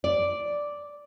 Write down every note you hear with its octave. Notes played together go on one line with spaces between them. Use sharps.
D5